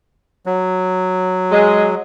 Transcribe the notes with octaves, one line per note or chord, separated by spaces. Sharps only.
F#3
G#3